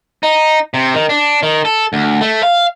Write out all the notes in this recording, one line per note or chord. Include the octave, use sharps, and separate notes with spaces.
D#4
C3
D#3
D4
D#3
A4
D2
A3
F5